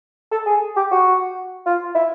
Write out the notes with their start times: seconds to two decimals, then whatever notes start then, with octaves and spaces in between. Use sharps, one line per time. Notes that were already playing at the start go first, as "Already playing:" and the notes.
0.31 A4
0.46 G#4
0.76 G4
0.91 F#4
1.66 F4
1.95 E4